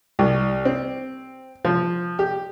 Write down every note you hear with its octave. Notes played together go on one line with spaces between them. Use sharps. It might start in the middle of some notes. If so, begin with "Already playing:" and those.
C2
C4
F3
G4